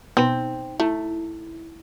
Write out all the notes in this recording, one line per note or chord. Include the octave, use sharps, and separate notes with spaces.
B2 B3 C4 D#4
A3 E4